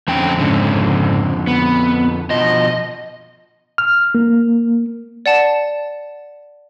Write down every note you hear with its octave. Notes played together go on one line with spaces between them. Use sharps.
F2 D3 A3 C#4 G5
G#2 C#3
B3
B2 F3 D#5
F6
A#3
D5 F#5 A5